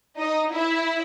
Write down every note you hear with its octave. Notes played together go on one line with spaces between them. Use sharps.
D#4 D#5
E4 E5